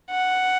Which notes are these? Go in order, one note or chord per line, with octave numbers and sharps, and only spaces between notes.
F#5